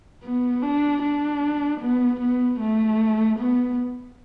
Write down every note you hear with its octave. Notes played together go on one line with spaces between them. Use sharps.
B3
D4
D4
B3
B3
A3
B3